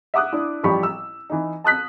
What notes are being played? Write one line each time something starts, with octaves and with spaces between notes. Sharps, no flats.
E5 F#5 D6 D#6 F#6
D4 E4
A1 F3 G3 G4 B5 C#6
E6
E3 D#4
A5 D#6 F#6 B6